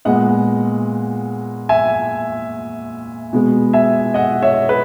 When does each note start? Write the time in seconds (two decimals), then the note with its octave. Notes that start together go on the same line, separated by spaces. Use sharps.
0.05 A#2 G#3 B3 D#5 F#5
1.69 E5 G#5
3.33 B2 G#3 B3
3.73 E5 G#5
4.14 D#5 F#5
4.42 C#5 E5
4.69 B4